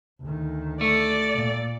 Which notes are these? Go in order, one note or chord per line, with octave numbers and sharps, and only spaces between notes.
D2 D#3
A3 D5
A#2